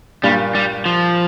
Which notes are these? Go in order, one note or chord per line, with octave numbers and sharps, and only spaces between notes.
G2 A#2 G3
G3
F3